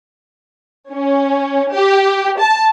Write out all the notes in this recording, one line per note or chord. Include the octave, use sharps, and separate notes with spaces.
C#4
G4
A5